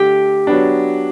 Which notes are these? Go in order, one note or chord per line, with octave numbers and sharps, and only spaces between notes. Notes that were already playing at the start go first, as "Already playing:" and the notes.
Already playing: D3 A3 G4 A4
F#3 B3 D4